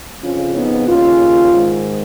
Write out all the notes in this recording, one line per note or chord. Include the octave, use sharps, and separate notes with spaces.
F2 C#3 C#4 F4
B3 D#4
D#2 C#3 C#4 F4
G#2 D#3